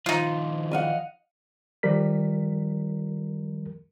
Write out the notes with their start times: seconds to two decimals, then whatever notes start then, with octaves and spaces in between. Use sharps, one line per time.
0.06 D#3 F3 D#4 F4
0.71 D#5 F5 F#5
1.83 D#3 F3 G3 A#4 B6